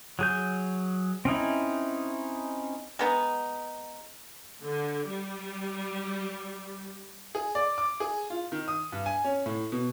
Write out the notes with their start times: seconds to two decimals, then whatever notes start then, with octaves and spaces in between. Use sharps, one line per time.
0.19 F#3 G#4 G6
1.25 C4 C#4 D#4 E4
2.99 G#3 B3 D#4
4.63 D3
5.09 G3
7.35 G#4
7.55 D5
7.78 D6
8.00 G#4
8.30 F4
8.52 D#3
8.68 D#6
8.92 G2
9.06 G#5
9.24 C#4
9.46 A2
9.72 B2